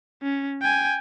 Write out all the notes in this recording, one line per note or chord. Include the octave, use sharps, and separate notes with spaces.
C#4
G5 G#5